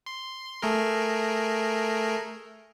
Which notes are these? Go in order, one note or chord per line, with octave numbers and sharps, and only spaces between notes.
C6
A3 G#4 A#4